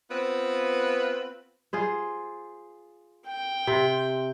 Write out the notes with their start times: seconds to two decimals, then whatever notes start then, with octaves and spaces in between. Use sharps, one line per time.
0.11 B3 C4 F4 B4
1.73 F4 G#4 C5
3.27 G5
3.67 C3 C4